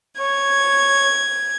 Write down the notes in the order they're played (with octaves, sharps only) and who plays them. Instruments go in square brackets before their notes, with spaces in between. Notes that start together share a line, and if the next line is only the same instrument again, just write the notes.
[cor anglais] C#5 [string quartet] G#6